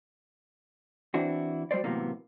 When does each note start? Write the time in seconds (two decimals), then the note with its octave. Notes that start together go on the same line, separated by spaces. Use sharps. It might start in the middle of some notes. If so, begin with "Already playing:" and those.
1.14 E3 C4 D4 E4 F#4
1.71 F#3 G3 B4 C5 D5
1.84 A2 C3 E3 F#3 A#3 B3